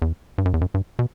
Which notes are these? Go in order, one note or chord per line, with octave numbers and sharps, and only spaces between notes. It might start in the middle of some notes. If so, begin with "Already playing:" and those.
E2
G2
F#2
E2
F#2
G2
B2